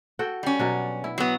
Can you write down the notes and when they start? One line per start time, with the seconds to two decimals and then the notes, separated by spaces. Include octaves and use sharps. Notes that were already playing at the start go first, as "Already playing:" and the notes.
0.19 F#4 A4 G5
0.43 G3 C#4
0.59 B2 F#3 D4
1.04 E4
1.18 F#3 B3